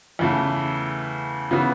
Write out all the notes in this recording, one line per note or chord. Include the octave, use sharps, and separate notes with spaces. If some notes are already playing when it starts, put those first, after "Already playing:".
E2 C#3 E3 A3
C#3 E3 B3 F#4